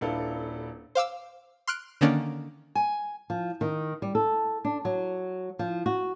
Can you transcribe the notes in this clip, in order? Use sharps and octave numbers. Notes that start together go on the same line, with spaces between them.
D#1 D4 E4 A4 B4 F5
C5 F5 D6 E6
C6 F6 F#6 D7
D3 D#3 A#3 C#4 D4
G#5
F3
D#3
G3
A4
D4
F#3
F3
F#4